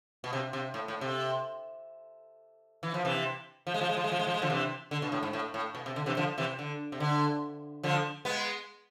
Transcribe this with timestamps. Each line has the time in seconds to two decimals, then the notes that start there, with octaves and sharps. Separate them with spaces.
0.24 B2
0.33 C3
0.53 C3
0.74 A2
0.88 A2
1.01 C3
2.83 E3
2.94 F3
3.05 C3 E3
3.67 F3
3.74 G#3
3.81 F3
3.89 G#3
3.97 F3
4.04 G#3
4.12 F3
4.19 G#3
4.27 F3
4.34 G#3
4.42 D3 F3
4.50 C3 E3
4.91 D3
5.02 B2
5.12 A2
5.23 G#2
5.33 A2
5.54 A2
5.75 B2
5.86 C3
5.96 D3
6.06 C3 E3
6.17 D3 F3
6.38 C3 E3
6.59 D3
6.92 C3
7.00 D3
7.83 D3 F3
8.25 G#3 B3